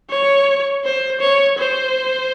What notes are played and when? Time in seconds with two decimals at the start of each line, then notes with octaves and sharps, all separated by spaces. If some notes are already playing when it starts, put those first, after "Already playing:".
0.10 C#5
0.85 C5
1.21 C#5
1.58 C5